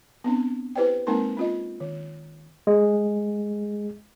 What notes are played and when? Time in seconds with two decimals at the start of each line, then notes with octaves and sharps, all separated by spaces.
0.24 B3 C4 D4
0.75 E4 G4 B4 C5 D5 G5
1.07 G#3 A#3 C4 D#4 A#4
1.37 C#4 F4 D#5
1.80 D#3
2.67 G#3